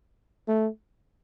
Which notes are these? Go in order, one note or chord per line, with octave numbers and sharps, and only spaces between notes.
A3